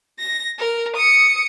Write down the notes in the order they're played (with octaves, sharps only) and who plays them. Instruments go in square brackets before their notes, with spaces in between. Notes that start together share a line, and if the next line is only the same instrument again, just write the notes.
[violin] A#6
A#4
D#6 C#7